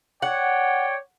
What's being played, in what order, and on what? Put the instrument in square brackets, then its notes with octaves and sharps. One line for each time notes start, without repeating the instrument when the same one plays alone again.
[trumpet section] C#5 D5 G5 [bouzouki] F#5